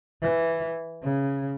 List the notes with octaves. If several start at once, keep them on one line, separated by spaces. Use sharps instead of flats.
E3
C#3